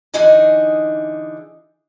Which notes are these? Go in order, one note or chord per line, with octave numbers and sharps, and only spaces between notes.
D3 E3 D#4 G#4 D#5 G#5